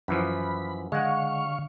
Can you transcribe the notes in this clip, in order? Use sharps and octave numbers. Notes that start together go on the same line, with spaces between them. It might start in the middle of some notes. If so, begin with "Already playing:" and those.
F#2 E3 F3 B5
D3 G#3 F5 F#5 C#6